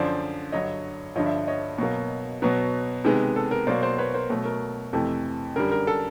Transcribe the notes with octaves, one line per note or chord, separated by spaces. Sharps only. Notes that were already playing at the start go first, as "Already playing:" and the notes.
Already playing: F#2 D3 F3 C5 D5
G2 D3 F#3 C#5 D#5
G2 D3 F3 C#5 D#5
D5 E5
C#5 D#5
B2 F#3 A#3
B2 F#3 B3
C3 D#3 G#3 B3
A4
A#4
B2 F#3 A#3 C5 D5
C5 D5
B4 C#5
A#4 C5
B2 F#3 A3
A#4
F2 C3 E3 A3 A4
F#2 D3 G3 A#4
A#4
A4